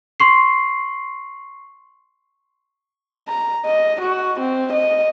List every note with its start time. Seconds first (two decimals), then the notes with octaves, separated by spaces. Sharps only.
0.20 C6 C#6 C7
3.28 A#5
3.66 D#5
4.02 F#4
4.40 C4
4.73 D#5